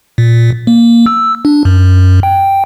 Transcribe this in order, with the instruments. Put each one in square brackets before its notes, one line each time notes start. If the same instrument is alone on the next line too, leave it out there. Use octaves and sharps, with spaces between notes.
[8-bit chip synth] A#2
A#3
E6
D4
F#2
G5